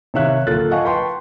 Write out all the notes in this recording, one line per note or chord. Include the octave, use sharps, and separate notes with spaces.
C3 D#3 C#5 E5 F5 F#6
D1 A#3 F4 A4 F#6 A6
D#5 F5 F#5 G#5 A5 C#6
B4 G5 A5 C6 C#6